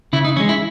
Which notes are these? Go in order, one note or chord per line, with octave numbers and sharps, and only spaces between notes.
C#3 E4
D#4
E3 G#3 C#4
E4